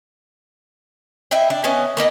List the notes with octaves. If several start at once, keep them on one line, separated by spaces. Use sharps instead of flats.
E4 D#5 E5 G5
D4
B3 C#4 D#5 G#5
A#3 B3 D#4 D#5